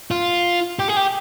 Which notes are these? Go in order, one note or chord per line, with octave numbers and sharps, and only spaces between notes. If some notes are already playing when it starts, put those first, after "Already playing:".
F4
G4
G#4
G4